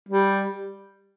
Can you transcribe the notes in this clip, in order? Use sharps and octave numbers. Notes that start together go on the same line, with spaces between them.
G3